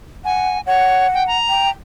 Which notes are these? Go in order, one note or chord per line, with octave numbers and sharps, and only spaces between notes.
F#5 G#5
C#5 F#5
G5
A#5
G5